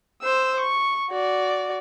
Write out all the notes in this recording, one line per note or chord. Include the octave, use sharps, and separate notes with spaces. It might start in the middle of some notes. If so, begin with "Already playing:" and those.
C5 E6
C#6
F#4 D5